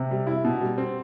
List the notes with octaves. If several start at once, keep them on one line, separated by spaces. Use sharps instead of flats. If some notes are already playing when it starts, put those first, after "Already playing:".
Already playing: C3
G3
E4
B2
G3
C4